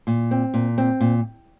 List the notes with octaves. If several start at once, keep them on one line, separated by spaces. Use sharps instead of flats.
A#2
C4
A#2
C4
A#2